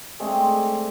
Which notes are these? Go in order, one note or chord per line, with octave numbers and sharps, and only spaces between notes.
G#3 A3 C4 D4